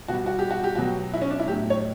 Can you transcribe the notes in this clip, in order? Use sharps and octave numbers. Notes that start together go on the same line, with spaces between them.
B2 G3 F#4
F#4
G4
F#4
G4
B2 F#3 F#4
E4
C#4
D4
E4
A2 F#3 G4
C#5